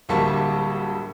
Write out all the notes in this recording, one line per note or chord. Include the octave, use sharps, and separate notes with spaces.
D1 D2 A2 G3 A#3 A5